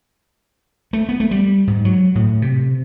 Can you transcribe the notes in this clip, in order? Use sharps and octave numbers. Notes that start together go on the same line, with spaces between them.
A3
B3
A3
G3
G#2
F#3
A2
C3